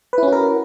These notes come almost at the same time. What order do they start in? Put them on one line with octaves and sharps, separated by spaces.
B4 E4 C#4 F#4 A#4